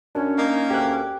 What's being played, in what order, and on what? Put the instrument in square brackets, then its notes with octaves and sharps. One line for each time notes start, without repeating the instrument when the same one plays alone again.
[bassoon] F#2 [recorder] C#4 [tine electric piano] D4
[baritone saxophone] A#3 [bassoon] D#4
[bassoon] D2 [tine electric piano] G4 F#6